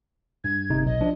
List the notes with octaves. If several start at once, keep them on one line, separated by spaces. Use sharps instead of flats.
G2 G#6
G1 C3 D#4
B1 D#5
F3 D4